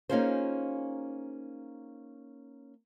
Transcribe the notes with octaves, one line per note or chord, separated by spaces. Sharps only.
A#3 C#4 D#4 F4 G#4 C5